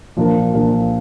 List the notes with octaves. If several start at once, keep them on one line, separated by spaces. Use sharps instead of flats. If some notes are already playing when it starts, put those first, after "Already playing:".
A#2 F3 A#3 D4 A#4
A#2 F3 A#3 D4 A#4